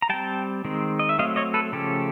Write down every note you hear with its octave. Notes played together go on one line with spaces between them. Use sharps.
A#5
G3 C4 G5 A5
D#3 G#3 C4
D#5
E5
F#3 A3 C4 D#5 F5
C#5 D#5
A4 B4
C#3 F3 A3 C#4 G4 A4